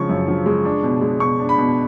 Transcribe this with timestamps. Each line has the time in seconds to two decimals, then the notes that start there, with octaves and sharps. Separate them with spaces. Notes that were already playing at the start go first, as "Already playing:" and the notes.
Already playing: C#3 F3 G#3 C#6
0.09 F#2
0.28 F3
0.46 G#3
0.65 D4
0.83 B2
1.01 G#3
1.20 B2 C#6
1.40 D4
1.49 B5
1.58 B2